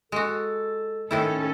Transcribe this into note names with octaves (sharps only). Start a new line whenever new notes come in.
G#3 F#4 A4
A2 D#3 C#4 E4 A4